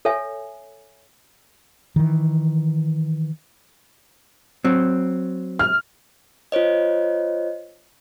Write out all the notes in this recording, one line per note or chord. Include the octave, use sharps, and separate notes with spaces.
A4 C#5 E5 G#5
D#3 E3
F#3 C4
F6
F4 C5 C#5 D#5